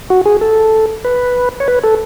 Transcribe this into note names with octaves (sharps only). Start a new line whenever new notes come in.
F#4
G#4
A4
B4
C#5
B4
A4